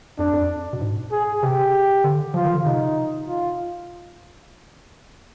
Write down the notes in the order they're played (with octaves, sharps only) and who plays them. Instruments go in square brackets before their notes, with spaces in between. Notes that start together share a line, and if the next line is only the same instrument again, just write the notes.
[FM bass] F2 [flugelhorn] D4
[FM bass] F2
B2
G#2
[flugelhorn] G#4
[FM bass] C3 [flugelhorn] G4
[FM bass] D3
[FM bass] F3 [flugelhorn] F4
[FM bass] D#3
D3
[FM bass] C3 [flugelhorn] D#4
[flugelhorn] F4